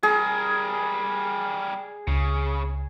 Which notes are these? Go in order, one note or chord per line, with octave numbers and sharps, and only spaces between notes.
G3 G#4 A#4
C#2 C#3